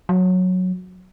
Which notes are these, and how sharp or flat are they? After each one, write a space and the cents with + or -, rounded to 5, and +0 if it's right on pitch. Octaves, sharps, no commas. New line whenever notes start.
F#3 -10